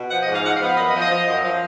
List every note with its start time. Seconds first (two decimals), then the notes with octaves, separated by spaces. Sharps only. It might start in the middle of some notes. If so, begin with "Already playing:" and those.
Already playing: B2
0.11 F3 F#5
0.22 D#5
0.27 G#2
0.33 F5
0.44 F3 F#5
0.55 F5
0.61 B3
0.67 F5
0.77 F#2 D#5
0.89 D#5
0.94 F3
0.99 D#5
1.11 F3
1.28 F#2
1.44 F3